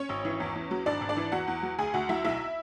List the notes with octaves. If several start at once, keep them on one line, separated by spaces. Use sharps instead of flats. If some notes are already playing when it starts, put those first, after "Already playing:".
Already playing: C#4 C#5
G#1
E3
E2
E2
F#3
G#1 D4 D5
G#1
D4 D5
E3
E2 F#4 F#5
E2
F#3
D2 G#4 G#5
D2 F#4 F#5
F#3 E4 E5
B1 E4 E5